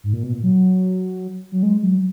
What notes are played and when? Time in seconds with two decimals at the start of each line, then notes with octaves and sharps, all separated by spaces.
0.04 G#2
0.13 A#2
0.23 B2
0.33 A#2
0.43 F#3
1.52 F#3
1.63 G#3
1.82 F#3